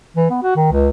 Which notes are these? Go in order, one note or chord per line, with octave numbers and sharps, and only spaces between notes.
E3
B3
F#4
D#3
C#2